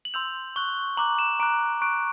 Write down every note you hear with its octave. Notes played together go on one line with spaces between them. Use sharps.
F#7
C6 E6 G6 F7
C#6 F#6 G7
A#5 D6 F#6 F#7
E7
A#5 D6 F#6 D7
C#6 F#6 D7